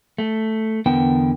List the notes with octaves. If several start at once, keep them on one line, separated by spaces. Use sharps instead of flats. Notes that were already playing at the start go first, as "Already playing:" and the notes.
A3
E2 D3 B3 A#4 G5